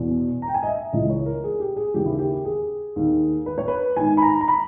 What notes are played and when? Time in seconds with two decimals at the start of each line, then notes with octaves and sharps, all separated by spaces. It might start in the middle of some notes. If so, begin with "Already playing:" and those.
Already playing: E2 B2
0.42 A#5
0.48 G5
0.54 G#5
0.63 D#5
0.67 E5
0.93 C#2 C#3 E3 D#5
1.10 C#5
1.26 A#4
1.44 G#4
1.60 G4
1.77 G#4
1.94 D#2 C#3 E3 G4
2.06 E4
2.18 G4
2.35 G4
2.45 G#4
2.96 D#2 D#3
3.46 B4
3.58 C#5
3.68 B4
3.96 G#2 D#3 G#5
4.17 B5
4.22 A#5
4.41 A#5
4.48 B5